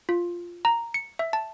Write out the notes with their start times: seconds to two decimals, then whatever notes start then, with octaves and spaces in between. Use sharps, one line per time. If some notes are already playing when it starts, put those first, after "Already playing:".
0.09 F4
0.65 A#5
0.94 C#7
1.19 E5
1.33 A5